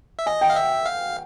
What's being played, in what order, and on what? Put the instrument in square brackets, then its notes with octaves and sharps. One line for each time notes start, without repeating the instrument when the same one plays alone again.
[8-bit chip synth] E5
[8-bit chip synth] D#5 [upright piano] G#5
[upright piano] G5
[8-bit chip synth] F5
E5
F5